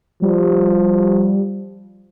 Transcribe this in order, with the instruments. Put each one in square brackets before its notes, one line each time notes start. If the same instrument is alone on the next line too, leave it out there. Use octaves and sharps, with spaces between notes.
[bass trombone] F3 [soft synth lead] G3